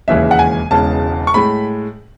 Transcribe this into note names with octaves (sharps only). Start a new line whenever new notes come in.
E1 D#2 C#3 E3 G#3 E5
F#5
G#5
E1 E2 C#3 G#3 A5
C#6
A2 G#3 B5